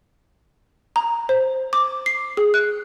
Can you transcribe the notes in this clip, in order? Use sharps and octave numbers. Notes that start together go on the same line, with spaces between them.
A#5
C5
D6
C7
G#4
F#6